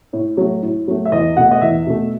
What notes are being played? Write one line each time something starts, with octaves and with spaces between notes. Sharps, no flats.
A2
F#3 A3
A2
F#3 A3
E5
E2 D#5
B2 A3 F#5
D#5
E2 E5
B2 A3